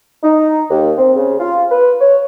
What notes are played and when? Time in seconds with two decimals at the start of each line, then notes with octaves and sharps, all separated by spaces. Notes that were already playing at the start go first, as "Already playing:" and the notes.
0.24 D#4
0.70 D#2
0.98 C4
1.16 C#3
1.40 F4
1.72 B4
2.01 C#5